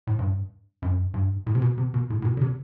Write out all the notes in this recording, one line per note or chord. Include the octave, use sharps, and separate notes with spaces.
A2
G2
F#2
G2
A2
C3
B2
C3
B2
A2
A2
B2
D3
C3